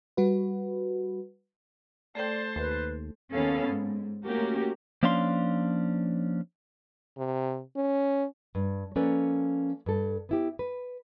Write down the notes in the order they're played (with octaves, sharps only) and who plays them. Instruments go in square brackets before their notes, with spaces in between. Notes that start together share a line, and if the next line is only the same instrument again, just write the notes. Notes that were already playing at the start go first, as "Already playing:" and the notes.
[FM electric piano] G3 F#4 B4
[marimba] A3 A4 G5 [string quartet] C5 A5 C6 [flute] D5
[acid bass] D#2 [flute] B4
[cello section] D#2 A#3 B3 C#4 A4 F5
G#2
A3 A#3 C#4 F#4 G4 A#4
[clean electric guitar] F3 A#3 C#4 D4 F5 C6
[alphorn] C3
C#4
[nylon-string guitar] G2
F3 A#3 C#4 A4 B4 D5
G2 A4
B3 E4 G4
B4